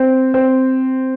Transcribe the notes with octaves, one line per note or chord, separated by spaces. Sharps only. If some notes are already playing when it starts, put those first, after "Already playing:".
Already playing: C4
C4